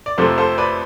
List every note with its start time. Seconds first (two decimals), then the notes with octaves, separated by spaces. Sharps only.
0.06 D5
0.18 F2 C3 F3 A3 A4 C5
0.38 A4 C5
0.58 B4 D5